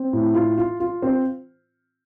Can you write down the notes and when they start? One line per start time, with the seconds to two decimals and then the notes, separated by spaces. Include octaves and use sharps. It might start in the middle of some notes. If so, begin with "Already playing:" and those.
Already playing: C4
0.13 A2
0.35 F4
0.58 F4
0.80 F4
1.02 C4